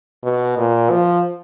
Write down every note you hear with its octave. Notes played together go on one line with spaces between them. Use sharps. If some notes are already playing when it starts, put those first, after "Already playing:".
B2
A#2
F3